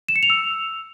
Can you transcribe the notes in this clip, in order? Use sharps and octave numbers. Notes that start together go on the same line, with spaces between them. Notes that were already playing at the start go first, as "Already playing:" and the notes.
E7
C#7
F7
E6